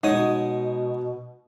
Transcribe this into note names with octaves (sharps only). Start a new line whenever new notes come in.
B2 G#3 D#4 C#5 F#5 D#6